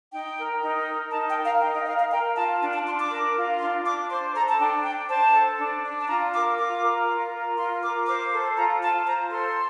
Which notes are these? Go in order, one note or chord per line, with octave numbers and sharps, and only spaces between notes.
D#4 G5
A#4
D#4
A#4
D#4 A5
G5
A#4
F5
D#4 G5
D#5
A#4 F5
F5
A#4 G5
F4 A5
D4 A5
A5
D4 C6
D6
A#4
F4
D4 C6
D4 D6
C5 C6
A4 A#5
A5
D4 G5
D4 G5
C5 A5
A4
D4
D4
A5
F4 A#5
A#4 D6
F4 D6
A#4
F4
A#4
F4 C6
A#4 D6
C5 D6
A4
F4 A#5
F4 A5
C5 A#5
A4 C6